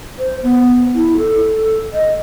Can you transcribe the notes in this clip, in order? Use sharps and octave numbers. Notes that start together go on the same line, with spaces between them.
C5
B3
E4
A4
D#5